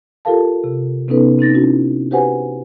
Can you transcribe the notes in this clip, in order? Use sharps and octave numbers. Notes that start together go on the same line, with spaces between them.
F4 G4 A4 A#4 F5 A5
C3
C3 B3 C#4 D#4 A4 B4
C4 D#4 A6 A#6
C#4 D#4 E4 F#4
F#4 G4 B4 C5 F#5 G#5